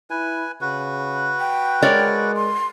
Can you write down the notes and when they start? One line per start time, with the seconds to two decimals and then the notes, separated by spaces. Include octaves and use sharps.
0.10 E4 B4 G#5
0.61 C#3 F#4 B4
1.40 G5
1.83 G#3 A#4 C#5 D5
2.36 C6